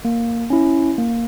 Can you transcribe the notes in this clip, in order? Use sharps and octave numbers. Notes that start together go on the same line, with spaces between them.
A#3
C#4 E4
A#3